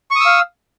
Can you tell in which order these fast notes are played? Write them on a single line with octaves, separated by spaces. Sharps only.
C#6 D#6 E6 F5